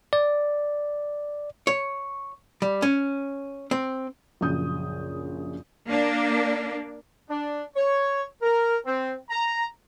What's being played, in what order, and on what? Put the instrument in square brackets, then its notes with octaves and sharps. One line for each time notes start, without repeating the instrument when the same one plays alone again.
[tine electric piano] D5
[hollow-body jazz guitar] C#5
G3
C#4
C4
[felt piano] A#1 F#2 C#3 D#6 G6
[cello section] A#3 D4
[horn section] D4
C#5
A#4
C4
A#5